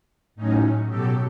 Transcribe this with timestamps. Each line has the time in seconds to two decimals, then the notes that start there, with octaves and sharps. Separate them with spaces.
0.36 A2 F#3 C#4 D#4
0.88 B2 F#3 G4 A4